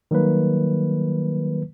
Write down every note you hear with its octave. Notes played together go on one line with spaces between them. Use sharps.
D#3 F#3 G3 A#3 B4